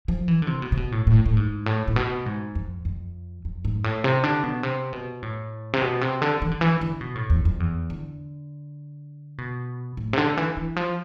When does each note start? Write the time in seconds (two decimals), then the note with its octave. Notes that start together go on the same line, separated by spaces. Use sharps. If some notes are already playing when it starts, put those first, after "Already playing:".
0.08 F3
0.28 E3
0.42 D3
0.47 C3
0.62 B2
0.72 C3
0.77 B2
0.92 A2
1.07 A2
1.26 A2
1.37 G#2
1.66 A2
1.88 A2
1.96 B2
2.26 G#2
2.55 F2
2.85 F2
3.45 F2
3.65 G#2
3.84 A2
4.04 C3
4.23 D3
4.44 B2
4.63 C3
4.93 B2
5.23 A2
5.73 C3
5.82 B2
6.01 C3
6.22 D3
6.42 E3
6.51 D3
6.61 E3
6.81 D3
7.01 B2
7.15 A2
7.30 E2
7.45 F2
7.60 E2
7.90 D3
9.38 B2
9.97 A2
10.13 C3
10.18 D3
10.37 E3
10.57 E3
10.76 F3